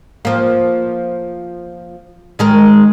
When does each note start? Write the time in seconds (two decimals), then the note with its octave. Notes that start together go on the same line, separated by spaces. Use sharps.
0.25 F3 A#3
2.39 D#3 G#3 A#4